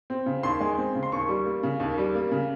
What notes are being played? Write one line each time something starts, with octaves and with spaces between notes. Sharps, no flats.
C4
C#3
D#2 C6
G#3
C4
C#3
C6
D#2 C#6
G3
A#3
C#3
D#2
G3
A#3
C#3